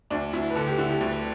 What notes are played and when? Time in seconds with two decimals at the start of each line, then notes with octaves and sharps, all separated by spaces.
0.10 D2 D4
0.33 D2 E4
0.50 B4
0.55 D3 A4
0.67 G4
0.78 D3 E4
0.90 G4
1.01 D2